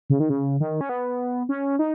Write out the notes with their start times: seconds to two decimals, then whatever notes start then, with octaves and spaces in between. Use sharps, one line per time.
0.10 C#3
0.20 D#3
0.30 C#3
0.60 D#3
0.81 C#4
0.89 B3
1.49 C#4
1.79 D#4